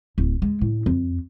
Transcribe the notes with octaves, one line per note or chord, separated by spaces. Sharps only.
D1
G#3
A2
F2